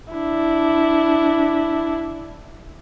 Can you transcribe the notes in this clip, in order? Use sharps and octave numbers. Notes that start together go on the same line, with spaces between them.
D4 E4